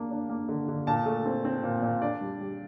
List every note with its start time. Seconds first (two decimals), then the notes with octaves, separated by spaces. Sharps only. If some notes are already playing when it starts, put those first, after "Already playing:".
Already playing: A#3 D4
0.11 D4
0.29 A#3
0.49 D3
0.68 D3
0.87 A#2 A5
1.06 A3
1.26 C4
1.45 C4
1.64 A#2
1.83 A#2
2.01 D4 D5
2.21 G3
2.40 G3